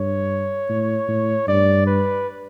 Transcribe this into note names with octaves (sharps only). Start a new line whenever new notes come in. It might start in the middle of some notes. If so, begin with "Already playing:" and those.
Already playing: G2 C#5
A2
A2
G2 D5
B4